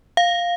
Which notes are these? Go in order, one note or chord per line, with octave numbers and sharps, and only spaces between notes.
F5